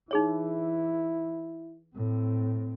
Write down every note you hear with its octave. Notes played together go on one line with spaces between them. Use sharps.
E3 D#4 E4 G#4 C#5
A2 C4